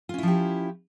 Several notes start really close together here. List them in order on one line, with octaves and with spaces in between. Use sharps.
F4 C#4 E4 F3 G4